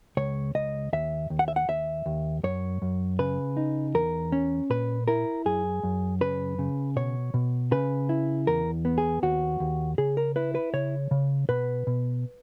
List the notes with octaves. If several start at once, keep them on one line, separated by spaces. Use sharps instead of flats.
C#2 C#5
C#2 D#5
D#2 E5
D#2
F#5
E5
F#5
D#2 E5
D#2
F#2 C#5
F#2
C#3 B4
D#4
E2 A#4
C#4
A#2 B4
E4 A#4
F#2 G#4
F#2
C#3 B4
C#3
B2 C#5
B2
C#3 B4
E4
E2 A#4
B3
G#4
D#2 F#4
D#2
C#3 G#4
A#4
E4 B4
B4
C#3 C#5
C#3
B2 B4
B2